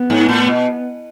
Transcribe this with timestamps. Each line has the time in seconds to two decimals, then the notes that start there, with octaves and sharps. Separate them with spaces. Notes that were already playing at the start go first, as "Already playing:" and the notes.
Already playing: B3
0.10 G#2
0.29 A2
0.47 B2